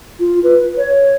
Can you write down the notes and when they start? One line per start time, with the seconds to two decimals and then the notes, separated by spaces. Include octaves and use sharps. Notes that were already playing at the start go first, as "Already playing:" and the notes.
0.20 F4
0.44 B4
0.77 C#5